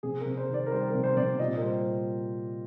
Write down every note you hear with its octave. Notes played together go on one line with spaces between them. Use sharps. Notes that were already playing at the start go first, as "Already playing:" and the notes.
C3 G#4
A#4
C3
C5
D#3
D5
A#4
G3 C5
C3 A#4
C5
C3 D5
A#2 D#5
A#4
G3 C5